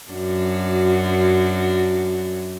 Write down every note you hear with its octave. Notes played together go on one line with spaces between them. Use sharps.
F#2 D4 F#4